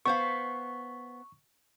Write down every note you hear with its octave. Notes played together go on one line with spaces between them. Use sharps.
B3 C5 F5 C#6